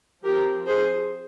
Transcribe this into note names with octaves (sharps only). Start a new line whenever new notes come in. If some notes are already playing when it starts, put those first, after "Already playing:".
F3 C4 G4 A#4
G#4 C5